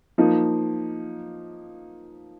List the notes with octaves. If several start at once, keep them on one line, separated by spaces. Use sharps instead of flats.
F3 A#3 D#4